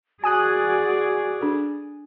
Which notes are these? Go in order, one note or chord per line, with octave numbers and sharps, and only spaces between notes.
F#4 G#4 D5 G#5 D#6 F#6
D4 A4